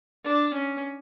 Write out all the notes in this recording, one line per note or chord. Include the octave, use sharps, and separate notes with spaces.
D4
C#4